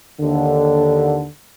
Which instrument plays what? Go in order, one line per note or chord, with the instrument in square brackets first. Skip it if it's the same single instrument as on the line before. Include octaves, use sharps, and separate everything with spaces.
[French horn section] D#2 D3